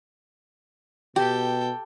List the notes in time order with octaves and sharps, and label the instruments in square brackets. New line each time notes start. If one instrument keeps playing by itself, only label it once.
[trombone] B2 [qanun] G4 [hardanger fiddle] A4 G5